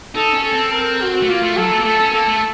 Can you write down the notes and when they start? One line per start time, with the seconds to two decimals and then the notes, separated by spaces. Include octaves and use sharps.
0.15 D#4 A4
0.34 C#4
0.44 A4
0.53 C4
0.71 A#4
1.00 F#4
1.22 A3
1.29 A#3 F4
1.42 A3
1.57 F#3 A4
1.71 A3
1.79 A#3
1.85 A3 A4
2.00 C#4
2.13 A#3 A4
2.28 A3